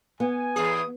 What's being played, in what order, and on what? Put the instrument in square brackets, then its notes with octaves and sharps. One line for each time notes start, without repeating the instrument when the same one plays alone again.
[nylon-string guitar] B3 [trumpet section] G#5
[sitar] E2 A2 G#4 [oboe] D#6